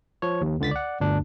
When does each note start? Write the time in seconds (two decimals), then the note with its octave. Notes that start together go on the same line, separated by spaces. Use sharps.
0.22 F3 C#5
0.41 D#2
0.60 C#2 D3 A6 B6
0.71 D5 F#5
1.00 G1 D2 D4